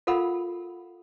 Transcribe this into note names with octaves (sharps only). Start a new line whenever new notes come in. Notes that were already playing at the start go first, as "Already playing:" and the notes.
F4 A4 A#4 F5 F#5 B5